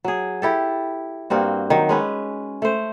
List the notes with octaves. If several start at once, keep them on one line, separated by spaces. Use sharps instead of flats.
F#3 G#4
E4 G4 A4
G2 A#3 C4 F#4
D#3 F#3
G#3 C#4 B4
A3 C5